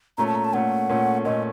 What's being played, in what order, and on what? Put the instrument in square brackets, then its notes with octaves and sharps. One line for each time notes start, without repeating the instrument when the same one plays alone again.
[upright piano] A#2 A3 C#4 [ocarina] A#5
[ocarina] A5
A#5
A5
[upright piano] A#2 A3 C#4 [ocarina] F#5
[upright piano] A#2 A3 C#4
[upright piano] A#2 A3 C#4 [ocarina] D#5